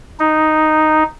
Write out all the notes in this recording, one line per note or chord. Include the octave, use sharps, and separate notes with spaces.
D#4